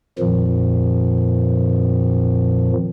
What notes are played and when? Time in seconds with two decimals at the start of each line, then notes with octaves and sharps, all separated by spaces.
0.19 F2 A#2 D#3 F3